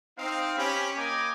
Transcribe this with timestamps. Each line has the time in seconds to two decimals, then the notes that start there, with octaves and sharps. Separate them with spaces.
0.17 C4 D#4 F5
0.57 C#4 G4 B5
0.96 A#3 D#5 G5 G#5 A#5 D6